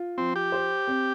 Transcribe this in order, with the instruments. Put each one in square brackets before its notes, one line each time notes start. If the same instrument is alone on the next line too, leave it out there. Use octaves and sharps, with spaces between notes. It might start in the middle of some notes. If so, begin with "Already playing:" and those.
Already playing: [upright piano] F4
[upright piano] F3 [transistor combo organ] C4
[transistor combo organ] G4
[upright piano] C5
C4